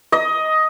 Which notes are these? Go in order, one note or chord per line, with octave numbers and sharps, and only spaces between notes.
D#5